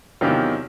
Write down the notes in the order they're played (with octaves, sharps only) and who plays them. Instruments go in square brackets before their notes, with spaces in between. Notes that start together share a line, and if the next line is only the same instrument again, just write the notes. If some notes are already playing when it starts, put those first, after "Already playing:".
[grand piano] E2 C3 D#3 F#3 F4 G4